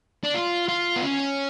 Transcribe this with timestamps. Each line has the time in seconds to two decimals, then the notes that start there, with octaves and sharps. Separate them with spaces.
0.24 D4
0.35 F4
0.69 F4
0.96 B3
1.03 C#4